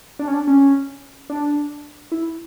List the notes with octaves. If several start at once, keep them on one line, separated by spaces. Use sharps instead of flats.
D4
C#4
D4
C#4
D4
E4